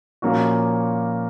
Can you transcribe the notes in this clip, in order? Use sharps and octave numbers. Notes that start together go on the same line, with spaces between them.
A#2 F3 A#3 C#4 F#4